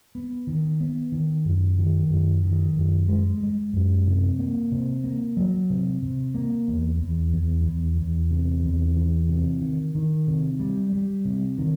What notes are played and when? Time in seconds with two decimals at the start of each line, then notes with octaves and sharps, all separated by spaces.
0.15 B3
0.47 D#3
0.80 B3
1.12 D#3
1.45 F#2
1.78 D#3
2.10 F#2
2.43 D#3
2.75 F#2
3.08 G#3
3.41 G#3
3.73 F#2
4.07 C3
4.39 A#3
4.72 C3
5.04 A#3
5.37 F#3
5.70 C3
6.02 C3
6.34 A#3
6.68 E2
7.00 E2
7.33 E2
7.65 E2
7.98 E2
8.31 C3
8.63 E2
8.97 E3
9.29 C3
9.61 D#3
9.95 D#3
10.27 C3
10.59 G3
10.93 G3
11.25 C3
11.58 D#3